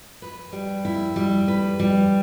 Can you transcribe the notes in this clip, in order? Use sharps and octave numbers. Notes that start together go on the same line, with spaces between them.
B4
G3
E4
G3
B4
G3